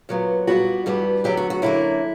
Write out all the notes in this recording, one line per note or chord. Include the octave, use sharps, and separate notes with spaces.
A#2 F#3 B3
A#2 G3 B3 F#4
G2 E3 G3 B3
F#2 D3 F#3 B3 G4
F#4
F#4
F#2 D3 A#3 E4